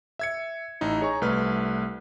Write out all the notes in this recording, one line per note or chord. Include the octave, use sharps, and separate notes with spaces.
E5 G#6 C#7
A1 D#4 E4
G#4 C#5 G#5 A#5 C#6
C2 A3 B4 F6